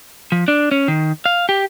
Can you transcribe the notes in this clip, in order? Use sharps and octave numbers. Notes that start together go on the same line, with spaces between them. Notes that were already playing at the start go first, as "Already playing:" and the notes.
F3
D4
C#4
D#3
F5
G4